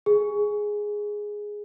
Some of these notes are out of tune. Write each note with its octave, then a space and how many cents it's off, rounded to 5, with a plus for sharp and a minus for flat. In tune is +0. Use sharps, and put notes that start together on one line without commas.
G#4 +0